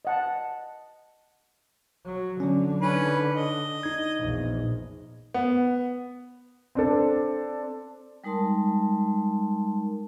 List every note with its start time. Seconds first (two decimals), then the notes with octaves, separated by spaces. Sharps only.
0.05 D#5 F#5 A5
2.05 F#3
2.40 D3 F#3 C#4
2.82 C#4 D#4 B4
3.33 D#5
3.83 D#4 G#6
4.18 A#1 E2
5.34 B3
6.75 C4 D4 A4
8.24 G3 G#3 D#4 A#4 A5 C6